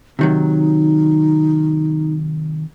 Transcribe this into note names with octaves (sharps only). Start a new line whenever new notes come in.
C3 D#3 F#3 D#4